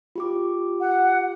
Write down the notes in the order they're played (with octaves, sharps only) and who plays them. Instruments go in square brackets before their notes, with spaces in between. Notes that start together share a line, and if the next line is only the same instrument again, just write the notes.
[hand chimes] F4 G4 D6
[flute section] F#5